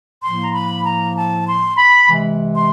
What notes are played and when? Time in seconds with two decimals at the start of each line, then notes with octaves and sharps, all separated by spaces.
0.23 A2 F3 A#3 C6
0.43 A#5
0.54 B5
0.85 A#5
1.16 A5
1.48 C6
1.78 B5
2.09 C3 E3 G#3
2.56 C6